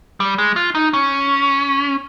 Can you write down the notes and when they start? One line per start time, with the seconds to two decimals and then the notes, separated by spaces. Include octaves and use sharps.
0.20 G3
0.38 G#3
0.56 F4
0.75 D#4
0.93 C#4